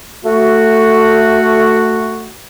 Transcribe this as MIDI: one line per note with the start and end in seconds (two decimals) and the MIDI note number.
0.25 2.30 57
0.25 2.30 66